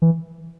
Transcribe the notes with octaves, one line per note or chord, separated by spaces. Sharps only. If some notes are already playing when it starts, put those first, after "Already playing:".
E3